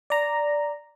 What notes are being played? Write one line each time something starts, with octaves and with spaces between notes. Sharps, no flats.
D5 A#5